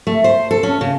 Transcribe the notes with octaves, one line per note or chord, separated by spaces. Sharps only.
A3
C5
A4
C#4
C#3